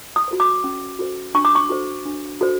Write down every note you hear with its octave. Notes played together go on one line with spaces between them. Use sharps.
D#6
F#4 A4 C5
D6
C#4
F#4 A4 C5
D4 C#6
D6
C#6
F#4 A4 C5
D4
F#4 A4 C5